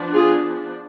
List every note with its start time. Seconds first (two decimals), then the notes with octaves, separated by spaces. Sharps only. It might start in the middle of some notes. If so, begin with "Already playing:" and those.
Already playing: F3 B3 D4
0.13 F4 G#4